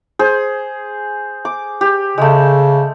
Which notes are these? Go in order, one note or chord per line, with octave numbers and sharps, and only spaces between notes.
G#4 C5
D6
G4
C#3 G#3 A3